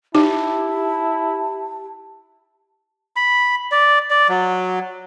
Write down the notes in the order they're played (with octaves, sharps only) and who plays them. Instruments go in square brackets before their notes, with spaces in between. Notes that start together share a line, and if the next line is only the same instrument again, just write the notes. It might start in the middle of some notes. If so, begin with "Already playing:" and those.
[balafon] D#4 [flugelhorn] E4 [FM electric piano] G4 [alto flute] A5
[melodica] B5
D5
D5
F#3